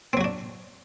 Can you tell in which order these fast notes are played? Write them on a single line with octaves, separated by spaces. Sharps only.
C4 F#3 F#4 D4